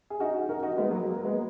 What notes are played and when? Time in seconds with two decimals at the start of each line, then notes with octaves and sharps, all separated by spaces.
0.10 G#4
0.20 D#4 F#4
0.49 F#4 A#4
0.63 D#4 F#4
0.77 G#3 B3
0.91 F#3 A#3
1.05 F#3 A#3
1.24 G#3 B3